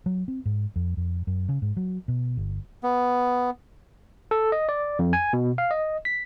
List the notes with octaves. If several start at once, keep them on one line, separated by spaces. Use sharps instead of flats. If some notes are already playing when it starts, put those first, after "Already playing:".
F#3
C4
G#2
F2
F2
F#2
C#3
G#2
F#3
B2
G1
B3
A4
D#5
D5
F2
G#5
B2
F5
D#5
B6